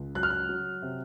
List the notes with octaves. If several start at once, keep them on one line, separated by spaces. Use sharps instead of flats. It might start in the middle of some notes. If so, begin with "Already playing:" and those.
Already playing: C#2
F#3 F#6
F6
F#6
F#3
C3